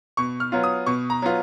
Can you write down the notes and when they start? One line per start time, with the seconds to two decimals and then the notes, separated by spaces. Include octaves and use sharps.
0.17 B2 C#6
0.40 F6
0.52 F#3 B3 F4
0.64 D#6
0.86 B2 C#6
1.10 A#5
1.22 F#3 B3 F4